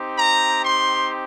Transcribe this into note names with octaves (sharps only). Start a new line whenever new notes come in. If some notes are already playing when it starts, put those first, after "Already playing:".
Already playing: C4 D#4 G4
A#5
C6